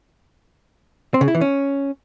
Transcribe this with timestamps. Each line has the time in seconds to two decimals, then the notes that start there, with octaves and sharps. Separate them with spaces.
1.14 C4
1.21 C#3
1.28 E4
1.35 E3
1.41 C#4